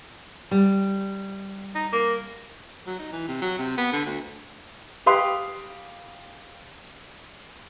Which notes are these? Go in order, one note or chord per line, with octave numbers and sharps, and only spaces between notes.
G3
D#4
A#3
F#3
D#4
E3
C3
F#3
C3
B3
D3
D2
G4 B4 F5 C6 D#6